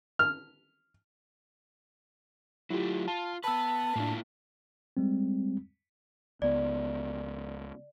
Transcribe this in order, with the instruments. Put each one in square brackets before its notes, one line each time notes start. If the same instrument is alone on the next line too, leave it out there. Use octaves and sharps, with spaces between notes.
[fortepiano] F6
[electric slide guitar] F#3 A3 [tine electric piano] E4 F4 G4
[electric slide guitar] F4 [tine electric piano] A5
[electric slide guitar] B3 B4 [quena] A5 [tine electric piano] B5 E6
[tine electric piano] A2 D4 [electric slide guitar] A#3 E4 F4
[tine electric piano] G3 G#3 C4
[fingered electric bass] C#2 B3 [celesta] D5